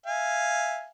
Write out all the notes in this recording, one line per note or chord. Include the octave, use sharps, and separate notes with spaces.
E5 F5 G#5